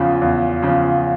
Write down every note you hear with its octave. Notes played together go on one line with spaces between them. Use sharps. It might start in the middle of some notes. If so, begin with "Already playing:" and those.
Already playing: E2 C#3 F3
E2
C#3 F3